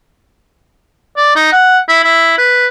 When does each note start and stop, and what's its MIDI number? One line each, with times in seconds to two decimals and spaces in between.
1.17 1.36 74
1.36 1.48 63
1.52 1.79 78
1.88 2.01 64
2.03 2.33 64
2.38 2.67 71